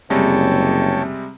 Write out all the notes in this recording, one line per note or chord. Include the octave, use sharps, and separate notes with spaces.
F#1 C3 G3 G#3 C#5 G5 A5